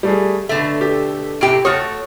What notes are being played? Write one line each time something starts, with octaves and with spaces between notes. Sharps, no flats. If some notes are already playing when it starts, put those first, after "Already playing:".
G3 A3 G#4
B2 D3 A3 E5
G4
A2 C3 G4 D7
A3 F#4 C#5 D#6 F6 A6